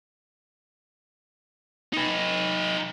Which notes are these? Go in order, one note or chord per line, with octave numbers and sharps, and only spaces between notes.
D#4 B4